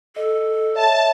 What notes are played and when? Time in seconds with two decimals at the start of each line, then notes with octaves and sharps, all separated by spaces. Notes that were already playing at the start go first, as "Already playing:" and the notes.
0.16 A4 D#5
0.75 C#5 D#5 E5 A5